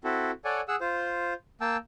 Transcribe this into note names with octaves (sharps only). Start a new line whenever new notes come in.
C4 E4 F#4 A4
A4 C#5 D5 F#5 G#5
G#4 F#5 E6
F4 C5
A#3 G5 A5 E6